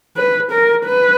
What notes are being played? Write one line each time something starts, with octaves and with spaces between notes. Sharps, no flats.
B4
A#4
B4